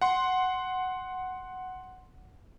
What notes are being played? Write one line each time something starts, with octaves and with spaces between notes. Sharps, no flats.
F#5 C6